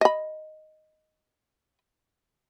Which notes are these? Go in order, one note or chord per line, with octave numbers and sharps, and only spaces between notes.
D#5 B5